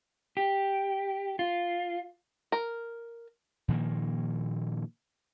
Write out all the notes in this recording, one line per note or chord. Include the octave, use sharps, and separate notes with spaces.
G4
F4
A#4
A#2 D#3 F3 A#3